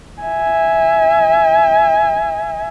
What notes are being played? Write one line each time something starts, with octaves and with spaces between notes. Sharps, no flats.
E5 G#5